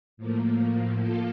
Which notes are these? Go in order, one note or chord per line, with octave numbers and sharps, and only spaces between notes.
A2 F3 A#3
F3 A#3 F4 A4